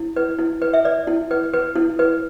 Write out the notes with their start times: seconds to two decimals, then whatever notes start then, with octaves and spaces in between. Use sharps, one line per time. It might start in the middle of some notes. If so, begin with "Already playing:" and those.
Already playing: E4
0.16 B4
0.39 E4
0.62 B4
0.73 E5
0.85 B4 D5
1.07 E4
1.31 B4
1.53 B4
1.76 E4
1.99 B4